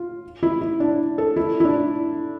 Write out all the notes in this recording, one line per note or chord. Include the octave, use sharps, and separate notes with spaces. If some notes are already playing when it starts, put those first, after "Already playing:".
Already playing: F4
E4
E4
D4
A4
E4
E4
D4